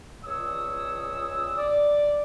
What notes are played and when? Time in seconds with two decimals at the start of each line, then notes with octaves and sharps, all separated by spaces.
0.24 C#2 A#2 C#5 D#6 E6
1.57 D5